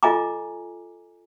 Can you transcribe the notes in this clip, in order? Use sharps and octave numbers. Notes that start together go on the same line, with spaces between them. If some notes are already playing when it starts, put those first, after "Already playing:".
F4 A4 D#5 G#5 A#5 D6